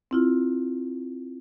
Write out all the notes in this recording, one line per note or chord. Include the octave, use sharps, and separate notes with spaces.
C4 E4 F4